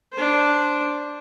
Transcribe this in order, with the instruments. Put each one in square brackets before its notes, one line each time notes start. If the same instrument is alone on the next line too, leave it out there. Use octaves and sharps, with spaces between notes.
[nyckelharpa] D4 C5